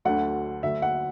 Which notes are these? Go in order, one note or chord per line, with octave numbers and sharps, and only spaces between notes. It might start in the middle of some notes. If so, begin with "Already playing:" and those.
D2 D3 F#3 A3 F#5
D2 D3 F#3 A3 E5
F#5